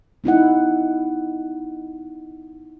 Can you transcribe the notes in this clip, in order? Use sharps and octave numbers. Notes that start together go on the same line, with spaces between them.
B3 D#4 E4 F#5